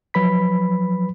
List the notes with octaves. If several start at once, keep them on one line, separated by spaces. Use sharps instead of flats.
F3 F#3 B4 B5 B6